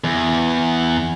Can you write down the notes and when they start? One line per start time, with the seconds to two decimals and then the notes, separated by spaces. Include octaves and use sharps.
0.04 E2